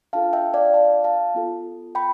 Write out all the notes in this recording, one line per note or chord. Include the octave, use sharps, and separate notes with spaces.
D4 F4 A4 F5 A5
E5 G5
D5 F5
F5 A5
F5 A5
B3 F4 A4
G5 B5